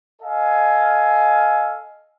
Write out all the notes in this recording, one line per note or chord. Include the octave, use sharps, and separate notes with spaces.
A4 D#5 F5 G#5